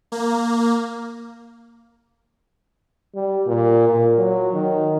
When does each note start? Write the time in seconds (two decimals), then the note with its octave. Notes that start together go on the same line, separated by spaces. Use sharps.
0.12 A#3
3.15 G3
3.46 A#2
3.89 A#2
4.18 F#3
4.54 D#3